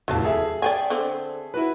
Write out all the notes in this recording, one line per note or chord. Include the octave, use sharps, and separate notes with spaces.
F1 D#2 A2 F#3 A5
G#4 A4 E5
D5 G5 G#5
D3 C4
E4 F#4 B4